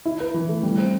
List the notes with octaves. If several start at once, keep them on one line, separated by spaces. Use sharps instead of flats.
E4
B4
E3
A3
G3
C4